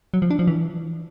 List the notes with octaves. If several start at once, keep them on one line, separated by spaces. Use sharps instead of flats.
F#3
F3
D4
F3
E3